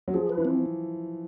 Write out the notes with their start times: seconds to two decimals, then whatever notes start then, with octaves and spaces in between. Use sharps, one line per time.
0.08 F#3
0.14 F3 G#4
0.30 B4
0.37 E3
0.45 C4